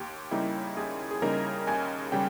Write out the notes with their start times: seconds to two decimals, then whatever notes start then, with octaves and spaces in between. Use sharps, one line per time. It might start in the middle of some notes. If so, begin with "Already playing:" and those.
Already playing: D#2 G4
0.31 C#3 G3 A#3 D#4 E4
0.77 D#2 G#4
1.11 G#4
1.22 C#3 G3 A#3 D#4 A#4
1.67 D#2 G#5
2.12 C#3 G3 G5